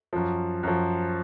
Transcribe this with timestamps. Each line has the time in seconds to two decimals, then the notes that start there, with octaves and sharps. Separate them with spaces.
0.13 F#2 F3
0.63 F#2 F3